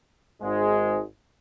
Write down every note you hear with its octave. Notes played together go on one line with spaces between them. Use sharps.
G#1 G#2 G#3